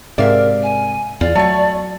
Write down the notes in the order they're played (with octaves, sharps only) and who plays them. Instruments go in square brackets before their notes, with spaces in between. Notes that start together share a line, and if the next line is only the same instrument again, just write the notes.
[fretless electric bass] G#2 C3 [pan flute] A#4 [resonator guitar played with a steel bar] D5 E5 F5
[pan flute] G#5
[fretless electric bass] E2 [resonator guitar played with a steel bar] F4 [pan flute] D5
[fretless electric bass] F#3 [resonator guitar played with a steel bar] A3 C#5